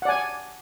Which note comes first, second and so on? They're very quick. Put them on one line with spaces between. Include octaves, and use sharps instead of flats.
F#5 D5 G#5